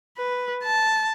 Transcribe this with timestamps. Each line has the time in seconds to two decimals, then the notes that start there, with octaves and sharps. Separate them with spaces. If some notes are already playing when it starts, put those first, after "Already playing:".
0.17 B4
0.63 A5